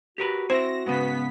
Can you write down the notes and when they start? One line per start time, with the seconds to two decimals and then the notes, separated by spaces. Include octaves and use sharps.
0.18 F#4 G4 A#4 B4
0.50 C4 E4 C5 A#6
0.86 G#2 C#3 B3 B6